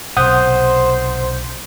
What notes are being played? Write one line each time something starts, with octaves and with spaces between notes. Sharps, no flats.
B1 C3 C5 F#5 D#6 G6